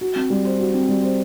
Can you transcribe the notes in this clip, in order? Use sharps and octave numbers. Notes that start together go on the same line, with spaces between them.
F#4
C4
G3
C5
F#4
C4
G3
C5